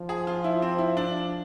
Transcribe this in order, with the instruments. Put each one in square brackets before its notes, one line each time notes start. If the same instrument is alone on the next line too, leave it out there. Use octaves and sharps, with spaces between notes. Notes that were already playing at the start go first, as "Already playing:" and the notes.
Already playing: [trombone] F3
[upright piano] G#4
F4
E4
C4
E4
D4